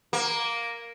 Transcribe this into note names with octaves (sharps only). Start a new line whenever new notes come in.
A#3